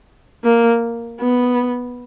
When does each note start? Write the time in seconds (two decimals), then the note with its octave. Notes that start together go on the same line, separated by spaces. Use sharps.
0.44 A#3
1.20 B3